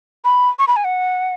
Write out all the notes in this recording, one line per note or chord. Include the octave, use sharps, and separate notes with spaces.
B5
C#6
B5
G#5
F#5